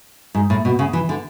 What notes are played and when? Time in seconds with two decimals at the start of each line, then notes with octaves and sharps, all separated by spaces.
0.35 G#2
0.50 A2
0.65 B2
0.79 C#3
0.93 E3
1.09 D3